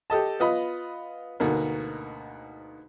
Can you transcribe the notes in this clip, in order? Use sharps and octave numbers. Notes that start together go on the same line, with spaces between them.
G4 A4 D#5 A5
B3 F4 D#5 B5
D2 G#2 B2 D3 A#3